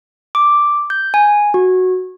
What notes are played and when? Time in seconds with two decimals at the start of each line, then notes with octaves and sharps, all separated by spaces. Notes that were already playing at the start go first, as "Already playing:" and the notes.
0.35 D6
0.90 G6
1.14 G#5
1.54 F#4